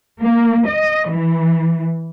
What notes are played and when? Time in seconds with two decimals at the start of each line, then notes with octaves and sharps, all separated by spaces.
0.21 A#3
0.68 D#5
1.11 E3